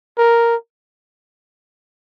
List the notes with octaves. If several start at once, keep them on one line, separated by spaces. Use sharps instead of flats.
A#4